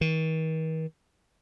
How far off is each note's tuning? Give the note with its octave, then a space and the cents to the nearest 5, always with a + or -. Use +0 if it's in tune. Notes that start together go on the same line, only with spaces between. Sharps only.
D#3 +45